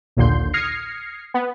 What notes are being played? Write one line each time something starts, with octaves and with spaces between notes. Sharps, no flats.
A#1 D#2 A#2 D3 C6 G6
D#6 F6 G#6 A#6 C7 C#7
B3